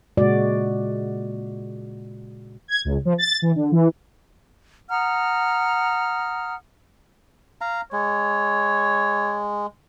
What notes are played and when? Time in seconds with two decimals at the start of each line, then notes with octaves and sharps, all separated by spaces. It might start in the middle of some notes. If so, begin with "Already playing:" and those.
0.17 A#2 C#3 G#3 F#4 D5
2.68 G#6
2.85 C#2
3.05 F3
3.18 A6
3.42 E3
3.55 D3
3.72 E3
4.90 F#5 A#5 D#6 F6
7.61 F5 A#5
7.92 G#3 C#5